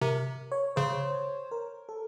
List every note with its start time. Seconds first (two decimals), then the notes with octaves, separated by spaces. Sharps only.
0.01 C3 A#4
0.52 C#5
0.76 C#3 C5
1.51 A#4
1.89 A4